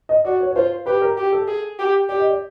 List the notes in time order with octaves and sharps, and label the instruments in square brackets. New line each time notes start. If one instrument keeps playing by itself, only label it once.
[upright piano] D#5
[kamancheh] F#4 [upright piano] D5
[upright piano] C#5
C#5
[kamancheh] F4 [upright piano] C5
[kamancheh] G4 [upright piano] B4
[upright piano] A#4
[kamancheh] G4
[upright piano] A4
[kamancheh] G#4
G4
[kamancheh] G4 [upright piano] D5
[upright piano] D#5
D5